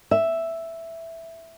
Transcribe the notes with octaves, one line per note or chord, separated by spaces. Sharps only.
E5